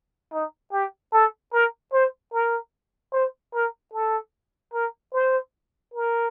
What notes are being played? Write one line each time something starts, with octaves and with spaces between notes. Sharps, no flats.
D#4
G4
A4
A#4
C5
A#4
C5
A#4
A4
A#4
C5
A#4